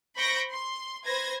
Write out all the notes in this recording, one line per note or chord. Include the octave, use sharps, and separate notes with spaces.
C5 B5 C#6 G6 A#6 D7
C6
B4 C5 G#6 A#6